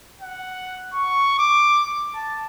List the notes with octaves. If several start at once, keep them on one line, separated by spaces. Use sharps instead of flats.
F#5
C#6
D6
A5